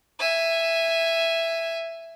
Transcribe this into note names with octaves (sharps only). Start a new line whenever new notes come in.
E5 G#5